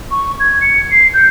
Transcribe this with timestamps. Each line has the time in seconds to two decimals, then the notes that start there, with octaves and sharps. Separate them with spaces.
0.11 C#6
0.40 G#6
0.61 C#7
0.91 C7
1.13 G6